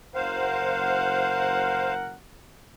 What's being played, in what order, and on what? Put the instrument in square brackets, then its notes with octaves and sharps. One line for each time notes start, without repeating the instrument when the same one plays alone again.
[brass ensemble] F#1 A#4 F#5 [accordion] C5 F5